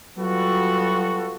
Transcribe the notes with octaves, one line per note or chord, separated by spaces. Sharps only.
F#3 G3 B3 F4 F#4 A4